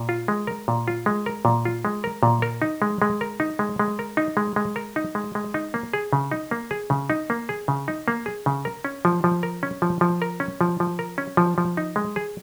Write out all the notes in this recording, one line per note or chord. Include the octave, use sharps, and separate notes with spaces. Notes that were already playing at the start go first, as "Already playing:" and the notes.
Already playing: A#2
F4
G#3
A#4
A#2
F4
G#3
A#4
A#2
F4
G#3
A#4
A#2
A#4
D#4
G#3
G#3
A#4
D#4
G#3
G#3
A#4
D#4
G#3
G#3
A#4
D#4
G#3
G#3
D#4
A#3
G#4
C#3
D#4
A#3
G#4
C#3
D#4
A#3
G#4
C#3
D#4
A#3
G#4
C#3
A#4
C#4
F3
F3
A#4
C#4
F3
F3
A#4
C#4
F3
F3
A#4
C#4
F3
F3
D#4
G#3
G#4